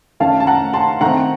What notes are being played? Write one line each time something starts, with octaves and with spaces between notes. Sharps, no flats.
D#3 A3 C#4 F5 A5
A5
F#5 A#5
A5 C6
D#3 A3 C4 F#5 A#5